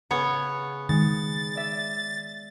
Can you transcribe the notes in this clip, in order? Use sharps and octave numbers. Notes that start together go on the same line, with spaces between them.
C#3 B3 C#5
D#3 G#3 A6
D5 E5